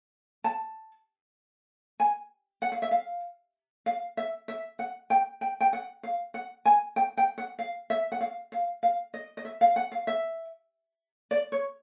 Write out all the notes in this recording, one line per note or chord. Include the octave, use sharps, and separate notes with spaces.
A5
G#5
F#5
F5
E5
F5
F5
E5
E5
F#5
G5
G5
G5
F#5
F5
F#5
G#5
G5
G5
F#5
F5
E5
F#5
F5
F5
F5
D#5
D#5
E5
F5
F#5
F5
E5
D5
C#5